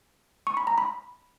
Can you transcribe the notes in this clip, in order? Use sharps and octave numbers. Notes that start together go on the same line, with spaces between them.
C#6
B5
A#5
B5